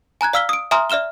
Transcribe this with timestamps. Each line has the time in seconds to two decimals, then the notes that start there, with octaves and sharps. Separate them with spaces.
0.21 G#5 A#5 F#6 G#6
0.33 D5 F5 E6 F6 B6 G7
0.49 D#6 D7
0.71 E5 G#5 A#5 C6 D#6 F6
0.90 D5 E5 F6 E7 G7